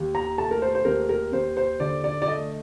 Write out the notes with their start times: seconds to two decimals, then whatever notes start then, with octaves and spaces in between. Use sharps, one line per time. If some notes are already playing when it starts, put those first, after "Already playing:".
Already playing: D#2
0.15 A#5
0.38 A3 A5
0.51 A#4
0.62 C5
0.75 C5
0.85 D#2 A#4
1.09 A#4
1.32 D#2 C5
1.57 C5
1.80 D3 D5
2.04 D5
2.22 D5
2.27 A3 D#5